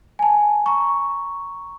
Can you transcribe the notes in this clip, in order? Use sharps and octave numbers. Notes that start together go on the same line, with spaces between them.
G#5 A5
A#5 C#6